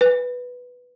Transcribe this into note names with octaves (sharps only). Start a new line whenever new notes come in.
B4